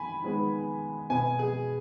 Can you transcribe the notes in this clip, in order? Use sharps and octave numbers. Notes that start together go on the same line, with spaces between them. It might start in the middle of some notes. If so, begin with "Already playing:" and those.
Already playing: D#3 B3 G#5 B5
D#3 G#3 B3
B2 B3 G#5
G#4